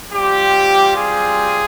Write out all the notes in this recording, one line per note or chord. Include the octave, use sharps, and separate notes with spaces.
G3 C4 F4 G4
G#4